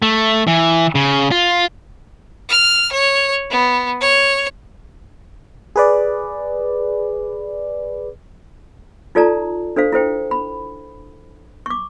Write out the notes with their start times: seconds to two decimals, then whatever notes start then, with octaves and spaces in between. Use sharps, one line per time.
0.02 A3
0.47 E3
0.95 C#3
1.31 F4
2.49 F6
2.92 C#5
3.51 B3
4.01 C#5
5.76 G#4 B4 D5
9.15 D#4 F4 A4 D5 A5 A#5
9.76 D4 A4 C5 F5
9.93 E4 A4 C5 G5
10.31 B5
11.66 C#6 D6